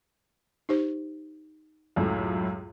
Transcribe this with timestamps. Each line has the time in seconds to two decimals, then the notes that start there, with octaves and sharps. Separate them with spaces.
0.69 D#4 G4 C5
1.96 C#2 F#2 A2